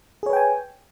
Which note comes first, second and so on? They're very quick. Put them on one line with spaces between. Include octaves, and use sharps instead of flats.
G#4 C#5 B4 G5 G#5